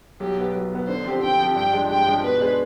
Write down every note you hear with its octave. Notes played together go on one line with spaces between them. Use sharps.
B1 G4
B2 B3
B1
B2 B3
D3 C5
F3 C4 G4
D3 G5
F3 C4 G4
G2 G5
F3 G#3 D4
G2 G5
F3 G#3 D4
B2 B4
G#3 D4 G#4 C5